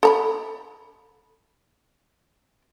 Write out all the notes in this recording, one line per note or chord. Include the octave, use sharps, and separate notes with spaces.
A4 A#5 B5